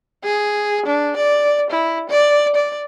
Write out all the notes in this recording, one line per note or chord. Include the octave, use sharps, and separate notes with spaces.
G#4
D4
D5
E4
D5
D5